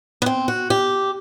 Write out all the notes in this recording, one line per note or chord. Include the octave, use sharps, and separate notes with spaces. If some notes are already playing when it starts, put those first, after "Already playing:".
B3
C4
F#4
G4